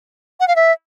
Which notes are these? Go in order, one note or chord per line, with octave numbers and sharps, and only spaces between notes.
F#5
F5
E5